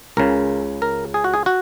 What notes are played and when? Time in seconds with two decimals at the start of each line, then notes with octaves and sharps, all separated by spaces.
0.17 C#2 C#3 A#4
0.82 A#4
1.14 G#4
1.24 F#4
1.34 G#4
1.46 F#4